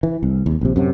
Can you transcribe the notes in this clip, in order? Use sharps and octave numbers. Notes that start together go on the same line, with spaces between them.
E3
C2
D#2
A#1 C3
F#2 C3 F#3